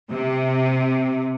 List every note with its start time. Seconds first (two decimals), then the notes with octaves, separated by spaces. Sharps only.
0.10 C3